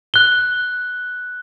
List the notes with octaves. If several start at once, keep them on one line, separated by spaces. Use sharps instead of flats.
F#6 G7